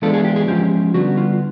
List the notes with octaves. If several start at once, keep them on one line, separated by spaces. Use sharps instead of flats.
E3 G#3 B3 D4 F4 A4
G#4
G4
G#4
F3 G#3 C#4 F4 G4
D3 G3 B3 F#4
F4